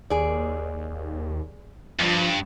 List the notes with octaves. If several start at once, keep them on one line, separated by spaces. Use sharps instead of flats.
D#2 G#4 D5
E2 G2 F3